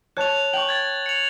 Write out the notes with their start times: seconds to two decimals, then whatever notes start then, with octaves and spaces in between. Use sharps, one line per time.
0.17 C#5 A5 F#6 F7
0.53 G5 C#6 F#7
0.69 G#6 A6
1.06 C#7 F7